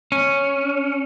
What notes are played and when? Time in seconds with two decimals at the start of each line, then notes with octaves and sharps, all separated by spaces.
0.12 C#4